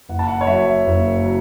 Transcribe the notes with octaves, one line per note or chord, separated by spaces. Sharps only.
F#1 F#5
A5
F#5
C#5
F#2 F#3 E5
F#1
F#3